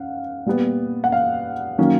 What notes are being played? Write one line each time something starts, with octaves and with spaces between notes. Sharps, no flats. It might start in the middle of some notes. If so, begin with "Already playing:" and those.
Already playing: C#4 F5 F#5
A#2 G3 B3
F#5
F5
D#3 F#3 A#3 C#4